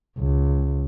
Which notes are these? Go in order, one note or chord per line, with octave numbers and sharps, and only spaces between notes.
C#2